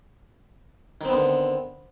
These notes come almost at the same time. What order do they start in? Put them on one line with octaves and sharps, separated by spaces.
D#3 C4 B3 D3